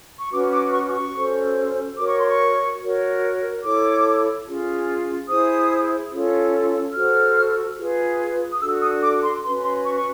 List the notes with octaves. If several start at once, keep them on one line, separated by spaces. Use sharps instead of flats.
C#6
C#4 F#4 B4 D6
D6
C#6
D6
C#6
C#4 F#4 A4 C5
F#4 A#4 C#5 D6
C#6
C6
C#6
F#4 A#4 C#5
E4 A4 C#5 D6
C#4 F4 G#4
E4 G#4 C5 D#6
C#4 F4 A4 C#5
F#4 A4 C5 F6
F4 G#4 B4
D#6
D4 F#4 A4 E6
D#6
D6
C6
C#4 F#4 B4 C6
C6
C#6
C#6